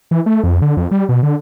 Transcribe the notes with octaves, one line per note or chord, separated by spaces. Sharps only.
E3
A3
F2
D3
F2
G3
B2
D3